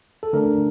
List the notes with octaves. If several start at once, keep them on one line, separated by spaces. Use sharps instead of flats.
A4
D3 A3 D4 A#4